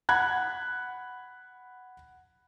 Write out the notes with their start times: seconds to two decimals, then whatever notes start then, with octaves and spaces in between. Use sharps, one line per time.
0.09 F#5 B5 F#6 G#6